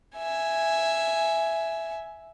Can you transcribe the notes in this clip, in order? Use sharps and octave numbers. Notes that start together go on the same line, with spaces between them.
E5 G#5